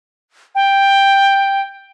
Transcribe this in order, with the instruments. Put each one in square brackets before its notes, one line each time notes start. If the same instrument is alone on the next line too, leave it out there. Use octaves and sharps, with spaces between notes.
[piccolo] G5